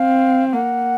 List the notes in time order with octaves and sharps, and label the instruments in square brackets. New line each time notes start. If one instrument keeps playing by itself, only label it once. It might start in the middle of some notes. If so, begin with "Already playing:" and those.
Already playing: [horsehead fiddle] C4 [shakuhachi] F5
[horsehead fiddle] A#3 [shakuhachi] F#5